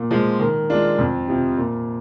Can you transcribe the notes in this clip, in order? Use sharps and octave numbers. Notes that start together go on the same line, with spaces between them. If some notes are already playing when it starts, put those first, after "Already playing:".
Already playing: A#2
F3 G#3
D#3
G#3 D4 F4
F2
C3 F3
A#2